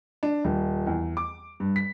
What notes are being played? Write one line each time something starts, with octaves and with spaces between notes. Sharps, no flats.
D4
D#1
E2
D6
G2
B6